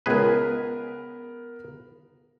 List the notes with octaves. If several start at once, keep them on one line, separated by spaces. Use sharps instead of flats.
C#2 B3 G#4 A#4 B4